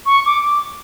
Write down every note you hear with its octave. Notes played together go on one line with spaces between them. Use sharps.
C#6
D6